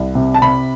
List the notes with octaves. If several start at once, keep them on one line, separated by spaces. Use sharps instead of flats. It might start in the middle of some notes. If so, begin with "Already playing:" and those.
Already playing: C2
C3
A5
C3 B5